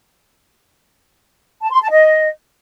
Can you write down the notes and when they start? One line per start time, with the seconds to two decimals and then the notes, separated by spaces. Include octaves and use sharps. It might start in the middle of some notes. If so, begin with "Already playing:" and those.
1.61 A5
1.71 C6
1.80 A5
1.90 D#5